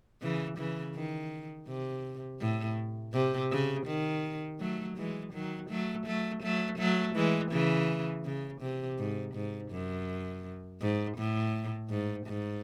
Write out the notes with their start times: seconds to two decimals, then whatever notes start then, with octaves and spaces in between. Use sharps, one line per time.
0.22 C#3 E3
0.58 C#3 E3
0.95 D#3
1.68 C3
2.41 A2
3.13 C3
3.51 C#3
3.87 D#3
4.60 F#3 A3
4.97 E3 G#3
5.33 D#3 F#3
5.70 F#3 A3
6.06 F#3 A3
6.43 F#3 A3
6.79 F#3 A3
7.15 E3 G#3
7.52 C#3 E3
8.25 C#3
8.61 C3
8.99 G#2
9.35 G#2
9.71 F#2
10.81 G#2
11.17 A2
11.90 G#2
12.27 G#2